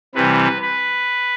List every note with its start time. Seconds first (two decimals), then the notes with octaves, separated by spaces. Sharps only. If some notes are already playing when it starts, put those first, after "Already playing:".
0.15 C3 E3 G3 B4
0.62 B4